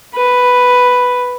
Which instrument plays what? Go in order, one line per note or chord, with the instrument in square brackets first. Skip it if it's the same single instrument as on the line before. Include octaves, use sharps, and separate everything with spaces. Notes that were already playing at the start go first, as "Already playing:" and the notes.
[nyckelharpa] B4